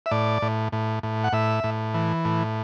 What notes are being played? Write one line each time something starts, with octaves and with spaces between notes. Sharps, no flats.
E5
A2 D5
A2
A2
A2
F#5
A2 E5
A2
E3
A2